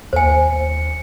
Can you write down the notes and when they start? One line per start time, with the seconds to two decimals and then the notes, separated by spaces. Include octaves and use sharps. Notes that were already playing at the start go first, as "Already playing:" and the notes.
0.13 D#2 C5 G#5 C#7